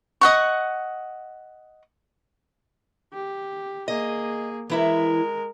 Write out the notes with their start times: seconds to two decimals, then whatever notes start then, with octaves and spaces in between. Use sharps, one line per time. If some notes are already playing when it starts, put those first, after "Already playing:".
0.21 D#5 F#5 C#6
3.13 G4
3.88 A#3 G#4 D#5
4.70 E3 G#3 E4 A#4 E5